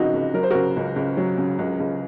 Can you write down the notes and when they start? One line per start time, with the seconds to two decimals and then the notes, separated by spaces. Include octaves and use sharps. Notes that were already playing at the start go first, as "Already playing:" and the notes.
Already playing: C#2 C3 F3 D#4 F#4
0.13 C#2
0.34 F#3 A#4
0.43 C5
0.50 C#3 F#4 A#4
0.76 C#2
0.96 C#2
1.17 F#3
1.38 C#3
1.59 C#2
1.80 C#2